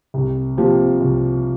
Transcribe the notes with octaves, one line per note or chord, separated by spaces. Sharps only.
C2
C3 F3 A#3
C2